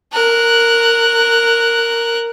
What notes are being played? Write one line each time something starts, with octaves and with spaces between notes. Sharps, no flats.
A#4 F#6